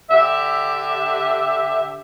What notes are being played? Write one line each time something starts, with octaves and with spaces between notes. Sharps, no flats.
D3 G4 E5